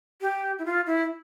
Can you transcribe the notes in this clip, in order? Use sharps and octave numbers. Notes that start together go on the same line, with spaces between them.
G4
E4
F4
E4